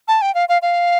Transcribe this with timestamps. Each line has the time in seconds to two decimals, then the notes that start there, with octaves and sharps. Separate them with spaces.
0.08 A5
0.22 G5
0.35 F5
0.49 F5
0.62 F5